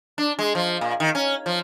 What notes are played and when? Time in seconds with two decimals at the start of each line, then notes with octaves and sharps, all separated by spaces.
0.18 D4
0.39 G#3
0.55 F3
0.81 A#2
1.00 D#3
1.15 C#4
1.46 F3